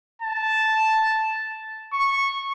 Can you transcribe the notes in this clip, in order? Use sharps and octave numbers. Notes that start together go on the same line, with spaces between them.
A5
C#6